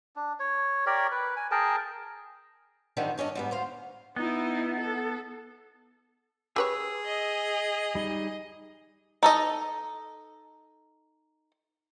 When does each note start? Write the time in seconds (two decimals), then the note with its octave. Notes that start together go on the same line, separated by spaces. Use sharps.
0.16 D4
0.40 C#5
0.86 G4 A#4 C#5 D5
1.11 B4
1.37 G#5
1.51 G#4 A#4 G5 A5
2.97 G#2 D3 D#3 F3 G3
3.18 G2 C#4 D4 D#5
3.35 G#2 G3 B3
3.51 D2 C5 F5
4.16 B3 D#4 E4
4.80 A4
6.56 G4 G#4 B4 C#5 E6
7.05 D#5
7.95 G3 D#4
9.23 D#4 A4 D#5